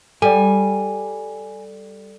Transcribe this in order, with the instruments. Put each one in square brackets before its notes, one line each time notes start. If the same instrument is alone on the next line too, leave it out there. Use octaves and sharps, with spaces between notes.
[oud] G3 [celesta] A4 D5 [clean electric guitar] G#5